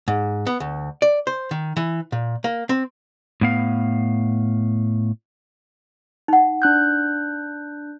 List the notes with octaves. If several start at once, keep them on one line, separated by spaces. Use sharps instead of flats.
G#2
B3
D2
D5
C5
D#3
E3
A#2
A#3
C4
A2 B3 F5
D#4 F#5
D4 F#6 G6